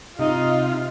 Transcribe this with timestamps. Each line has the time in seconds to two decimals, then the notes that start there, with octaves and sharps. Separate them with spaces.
0.19 C3 D#4 F4